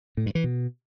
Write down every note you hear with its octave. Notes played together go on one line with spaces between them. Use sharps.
A2
G2
E3
B2